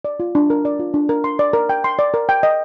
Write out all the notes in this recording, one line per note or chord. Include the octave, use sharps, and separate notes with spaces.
D5
F4
D4
A#4
D5
F4
D4
A#4
C6
D5
A#4
G5
C6
D5
A#4
G5
D#5